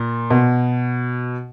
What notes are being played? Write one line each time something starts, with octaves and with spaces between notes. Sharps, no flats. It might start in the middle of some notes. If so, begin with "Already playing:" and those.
Already playing: A#2
B2